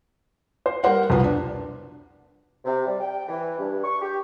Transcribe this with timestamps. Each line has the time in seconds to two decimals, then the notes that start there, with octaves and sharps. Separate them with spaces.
0.66 C5
0.84 G3 A#4 C5 F#5
1.10 C2 F2 B2 B3
1.24 D4
2.65 C3
2.86 G3
3.01 G5
3.28 E3
3.59 G2
3.83 C#6
4.01 G4